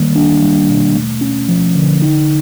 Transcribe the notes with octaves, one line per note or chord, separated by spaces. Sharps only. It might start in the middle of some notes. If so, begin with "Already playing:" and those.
Already playing: D#3 G3 A#3
D4
G3
B2
A3
C#4
F3
D3
D#4